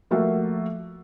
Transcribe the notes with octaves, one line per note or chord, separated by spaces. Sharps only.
F3 A3 A#3 F4 F#4 E5